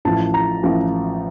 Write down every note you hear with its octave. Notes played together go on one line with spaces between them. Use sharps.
A1 A2 F3 A5
A#5
A1 A2 F3